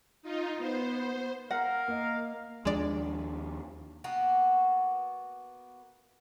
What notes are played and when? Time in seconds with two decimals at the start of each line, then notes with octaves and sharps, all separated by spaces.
0.23 D#4 F4
0.59 B3 C5
1.51 A#4 F5 F#5 A#6
1.88 A#3 D#5
2.65 D#2 F3 G#3 D4 D5
4.04 A#3 B3 F#4